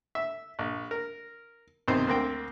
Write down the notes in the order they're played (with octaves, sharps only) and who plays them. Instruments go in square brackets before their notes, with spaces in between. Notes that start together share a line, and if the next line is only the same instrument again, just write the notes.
[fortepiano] E5
A#1
A#4
B1 C3 D#3 C4 C5 D#5
D2 A#3 C4 G5